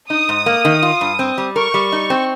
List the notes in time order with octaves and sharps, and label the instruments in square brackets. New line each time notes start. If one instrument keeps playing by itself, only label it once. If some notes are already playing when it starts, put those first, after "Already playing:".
[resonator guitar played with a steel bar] D#4 [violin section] D#6
[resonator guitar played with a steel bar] G#2
A#3
D#3
F4
G2
C4
G3
[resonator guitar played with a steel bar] A#4 [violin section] C#6
[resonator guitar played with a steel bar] G3
D#4
C4